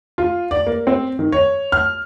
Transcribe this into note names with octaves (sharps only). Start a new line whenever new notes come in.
F4
D5
A#3
C4
D#3
C#5
F6